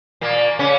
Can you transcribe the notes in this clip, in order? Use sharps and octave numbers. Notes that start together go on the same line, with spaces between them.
A#2 A#3
C#3 C#4